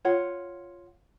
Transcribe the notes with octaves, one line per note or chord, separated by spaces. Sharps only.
F4 C#5 F#5